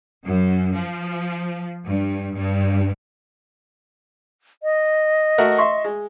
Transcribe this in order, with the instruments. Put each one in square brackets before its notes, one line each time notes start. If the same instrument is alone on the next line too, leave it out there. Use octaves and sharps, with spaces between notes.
[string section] F#2
F3
G2
G2
[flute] D#5
[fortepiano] A3 F#4 A#4
E5 C6 C#6
G#3